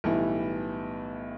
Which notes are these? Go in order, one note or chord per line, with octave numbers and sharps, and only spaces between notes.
B1 A2 E3 G3 B3